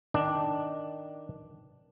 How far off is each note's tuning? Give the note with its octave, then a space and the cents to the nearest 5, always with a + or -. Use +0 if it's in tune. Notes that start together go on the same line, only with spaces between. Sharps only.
D#3 +0 D4 +0